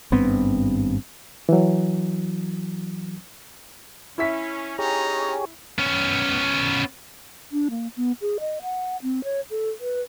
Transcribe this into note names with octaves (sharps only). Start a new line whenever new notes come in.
G#1 G2 B3 C4
E3 F#3
C#4 E4 E5 B6
C#4 D#4 G4 G#4 C#5 A#5
B3 C#4
D4
A#3
B3
G#4
D#5
F#5
C4
C#5
A4
B4